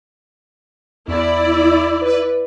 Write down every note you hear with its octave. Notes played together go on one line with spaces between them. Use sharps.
E2 E4 D5
B4